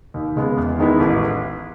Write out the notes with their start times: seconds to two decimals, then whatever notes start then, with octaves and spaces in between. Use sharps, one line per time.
0.14 D#2
0.36 C#3 G#3 B3
0.57 E2
0.79 D#3 G#3 B3 E4
1.00 A1